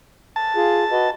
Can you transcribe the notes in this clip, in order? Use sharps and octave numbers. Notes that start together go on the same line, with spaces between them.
A5
F4 G#4
F#4 B4 D#5